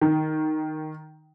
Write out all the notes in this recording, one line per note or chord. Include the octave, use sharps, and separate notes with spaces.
D#3